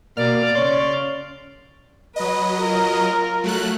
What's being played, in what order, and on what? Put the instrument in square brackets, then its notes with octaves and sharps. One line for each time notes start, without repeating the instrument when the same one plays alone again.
[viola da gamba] B2 [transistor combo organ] A#3 F6 [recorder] D5
[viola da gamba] C#3 [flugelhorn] C#5 [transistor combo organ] C6 F6
[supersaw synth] F#3 D#5 [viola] B4
[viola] F4 A#4
[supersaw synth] F#3 A3 F#6